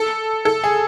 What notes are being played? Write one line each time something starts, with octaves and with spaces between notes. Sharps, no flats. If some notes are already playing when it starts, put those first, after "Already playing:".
Already playing: A4
A4
G#4